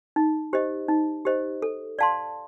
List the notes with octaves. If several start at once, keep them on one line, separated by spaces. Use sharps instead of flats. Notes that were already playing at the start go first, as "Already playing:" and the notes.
D#4
G4 C5 D#5
D#4
G4 C5 D#5
A4
D5 F5 A5 C6